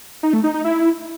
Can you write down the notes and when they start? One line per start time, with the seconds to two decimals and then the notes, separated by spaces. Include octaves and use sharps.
0.23 D#4
0.33 A3
0.44 D#4
0.54 D#4
0.64 E4